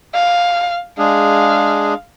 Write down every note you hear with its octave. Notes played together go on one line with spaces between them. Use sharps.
F5
G#3 D4 G#4 F5